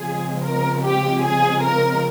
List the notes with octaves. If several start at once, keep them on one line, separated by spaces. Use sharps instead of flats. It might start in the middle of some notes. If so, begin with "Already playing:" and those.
Already playing: C#3 F3 G#3 C4 G#4
A#4
G4
G#4
A#4